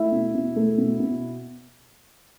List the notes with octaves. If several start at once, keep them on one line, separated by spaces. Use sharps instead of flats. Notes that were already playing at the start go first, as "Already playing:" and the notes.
Already playing: A3 E4 E5
B2
B2
A3
B2
B2